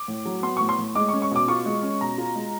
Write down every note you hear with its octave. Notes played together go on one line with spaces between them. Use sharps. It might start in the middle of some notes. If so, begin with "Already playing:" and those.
Already playing: D6
A2
F#3
B3 C6
A2 C#6
C6
A2
G#3 D6
C#6
C#4
C#6
B2 D6
F4 C#6
G#3
C#4
B2 A#5
F4
G#3